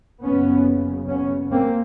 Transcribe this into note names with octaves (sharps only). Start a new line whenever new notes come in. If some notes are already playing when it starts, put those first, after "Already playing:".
F#1 F#2 C#3 B3 C#4
B3 C#4
A#3 C4